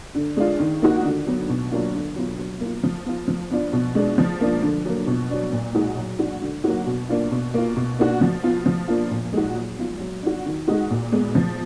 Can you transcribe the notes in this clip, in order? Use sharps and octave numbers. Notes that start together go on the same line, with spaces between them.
D3
G#3 D4 F4
D#3
A#3 D#4 F#4
D3
F#3 B3
B2
F#3 A#3 D4 F4
D3
F#3 B3 F4
F#3
A#3 F4
F3
B3 F4
F3
B3 D4 F4
B2
G#3 D4
F3
A#3 D4 F4
D3
F#3 A#3
B2
F#3 D4
A#2
G#3 D#4 F#4
F#3
D4 F#4
D3
F#3 A#3 D#4 F#4
B2
A#3 D4 F4
B2
A#3 F4
B2
A#3 D4 F#4
F3
B3 F4
F3
A#3 D4 F4
A#2
G#3 D#4 F#4
F#3
B3 F4
F#3
D4 F#4
D#3
G#3 D#4 F#4
A#2
G#3 B3
F3